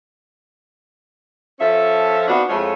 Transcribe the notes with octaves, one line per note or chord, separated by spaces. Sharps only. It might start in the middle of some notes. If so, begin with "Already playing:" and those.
F3 C#4 A4 E5
B3 C4 D4 D#4 F4 F#4
F2 G#3 A3 E4 F4 C#5